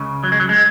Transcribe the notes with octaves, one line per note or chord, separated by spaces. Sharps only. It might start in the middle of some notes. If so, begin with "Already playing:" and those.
Already playing: C#2 C#3
F#3
G#3
F#3
G#3